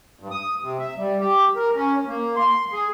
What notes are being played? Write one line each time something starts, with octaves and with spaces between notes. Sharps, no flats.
G2
D#6
C3
E5
G3
G4
A#4
C#4
A#3
C6
G#4